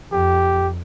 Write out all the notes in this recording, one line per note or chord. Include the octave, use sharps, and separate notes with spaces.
F2 G4